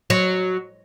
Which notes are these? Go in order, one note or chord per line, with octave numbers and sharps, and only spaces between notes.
F#3